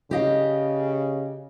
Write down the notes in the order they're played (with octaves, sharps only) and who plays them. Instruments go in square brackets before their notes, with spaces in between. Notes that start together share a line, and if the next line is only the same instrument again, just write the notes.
[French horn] C#3 [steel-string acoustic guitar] G4 D#5 F5